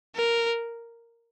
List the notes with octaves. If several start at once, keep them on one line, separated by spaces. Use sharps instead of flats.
A#4